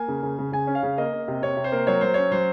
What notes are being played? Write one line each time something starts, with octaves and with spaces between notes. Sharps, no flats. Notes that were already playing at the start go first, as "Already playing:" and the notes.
Already playing: A#3 G#5
C#3
C#3
C#3
C#3 G#5
C#4
F5
C#3
A#3 D#5
A#3
C3
C3 C#5
C3
C5
A#3
F#3 C#5
F#3 C5
C#4 C#5
F#3 C5